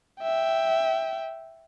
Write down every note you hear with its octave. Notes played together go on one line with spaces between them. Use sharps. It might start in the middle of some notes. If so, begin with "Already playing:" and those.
E5 G5